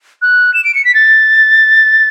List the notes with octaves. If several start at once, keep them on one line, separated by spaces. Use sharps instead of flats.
F#6
E7
D7
C#7
B6
A6